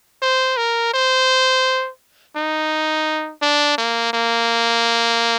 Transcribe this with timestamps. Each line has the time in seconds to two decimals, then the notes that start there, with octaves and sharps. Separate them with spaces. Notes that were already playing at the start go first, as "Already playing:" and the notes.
0.22 C5
0.57 A#4
0.94 C5
2.36 D#4
3.42 D4
3.78 A#3
4.13 A#3